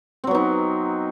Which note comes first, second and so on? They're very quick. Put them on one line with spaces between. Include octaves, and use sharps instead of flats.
C4 F#3 B3 D#4